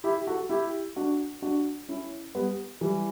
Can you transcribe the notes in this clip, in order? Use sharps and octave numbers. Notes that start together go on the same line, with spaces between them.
E4 G4
F#4 A4
E4 G4
D4 F#4
D4 F#4
C#4 E4
G3 B3
E3 G3